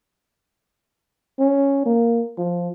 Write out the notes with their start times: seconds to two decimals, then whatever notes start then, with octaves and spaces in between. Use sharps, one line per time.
1.39 C#4
1.86 A#3
2.38 F3